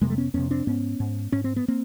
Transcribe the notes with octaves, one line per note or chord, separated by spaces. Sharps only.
F2 C3 G#3 A#3
G3 A3
B3 C#4
F2 C3 B3 C#4
C4 D4
G#2 B3 C#4
G#2
G#2 C#4
C4
B3
A#3 C4